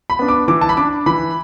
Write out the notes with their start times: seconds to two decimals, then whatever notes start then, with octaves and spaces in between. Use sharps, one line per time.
0.10 B5
0.19 B3 D4
0.28 D6
0.48 E3 D6
0.61 A5
0.69 B5
0.77 D4 D6
1.06 E3 B5